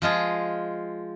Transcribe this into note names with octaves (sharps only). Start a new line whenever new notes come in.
F3 G#3 F4 G#4